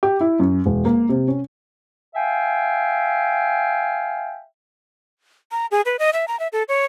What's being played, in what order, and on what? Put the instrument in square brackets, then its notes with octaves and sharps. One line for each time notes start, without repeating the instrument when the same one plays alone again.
[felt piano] G4
E4
F#2
E1
A#3
C3
C#4
[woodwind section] E5 F5 G5 G#5
[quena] A#5
G#4
B4
D#5
E5
A#5
E5
A4
C#5